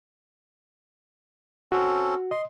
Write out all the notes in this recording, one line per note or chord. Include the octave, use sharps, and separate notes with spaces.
C4 C#4 F#4 A4
D#5 C6